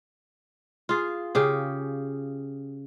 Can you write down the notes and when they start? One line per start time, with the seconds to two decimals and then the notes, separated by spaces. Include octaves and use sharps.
0.89 F4 G#4
1.35 C#3 G4 G#4